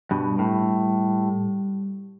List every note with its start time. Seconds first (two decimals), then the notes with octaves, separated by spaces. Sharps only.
0.11 G2 B2 G3
0.39 A2